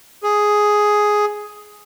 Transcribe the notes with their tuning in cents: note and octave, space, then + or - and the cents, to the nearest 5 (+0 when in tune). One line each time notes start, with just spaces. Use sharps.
G#4 +5